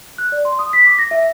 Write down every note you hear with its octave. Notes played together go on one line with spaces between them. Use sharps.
F#6
D5
C6
D#6
B6
D6
A#6
E5